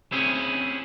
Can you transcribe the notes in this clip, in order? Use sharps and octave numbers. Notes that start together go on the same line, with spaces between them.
C4 C#4 E4 G#4